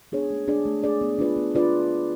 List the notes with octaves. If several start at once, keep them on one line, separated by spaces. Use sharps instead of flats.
B3 D4 G#4 C#5
A3
D4 G#4 D5
A3
D4 G#4 D5
B3
D4 F4 B4 D5
B3
D4 F4 B4 D5